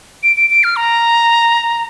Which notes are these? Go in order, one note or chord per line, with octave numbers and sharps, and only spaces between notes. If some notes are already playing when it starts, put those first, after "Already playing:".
D7
D7
D7
F6
A#5